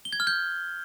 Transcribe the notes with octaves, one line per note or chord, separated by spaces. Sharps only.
G7
G#6
F6
G6